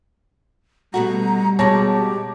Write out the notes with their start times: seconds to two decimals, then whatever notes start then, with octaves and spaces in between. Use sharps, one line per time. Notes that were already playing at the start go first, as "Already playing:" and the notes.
0.94 B2 G3 A3 F#4 A#5
1.59 B2 G#3 G4 C#5 A5 A#6